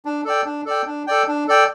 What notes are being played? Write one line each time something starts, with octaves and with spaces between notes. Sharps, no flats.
D4
A4 D5 G5
D4
A4 D5 G5
D4
A4 D5 G5
D4
A4 D5 G5